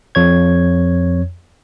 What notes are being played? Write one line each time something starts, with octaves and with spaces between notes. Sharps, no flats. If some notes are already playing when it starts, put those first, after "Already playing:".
F2 C#5 G#6